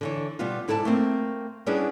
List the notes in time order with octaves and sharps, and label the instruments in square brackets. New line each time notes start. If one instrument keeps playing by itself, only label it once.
[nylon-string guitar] D3 E3 C#5
B2 G3 B3 F4
G#2 E4 A4 D5 G5 A5
A3 A#3 C4
G3 B3 C#4 D4 E4 G#4